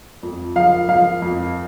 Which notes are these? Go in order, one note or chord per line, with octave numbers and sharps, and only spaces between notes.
F2
F3 F5
F3 F5
F2